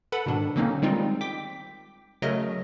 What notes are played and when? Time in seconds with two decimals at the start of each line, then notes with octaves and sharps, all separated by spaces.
0.12 A4 B4 F#5 B5
0.26 G#2 B2 D#3 D4
0.56 D3 F#3 A#3 C4 C#4 D#4
0.82 D#3 G3 G#3 C4 D#4 F4
1.21 G5 D6 B6
2.22 C#3 F#3 A3 A#4 D#5